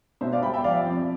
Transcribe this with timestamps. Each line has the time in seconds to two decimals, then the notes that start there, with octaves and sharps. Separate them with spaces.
0.21 B2 C5 E5
0.32 D5 F5
0.43 G3 G5 B5
0.54 E5 G5
0.64 F3 D5 F5
0.86 F2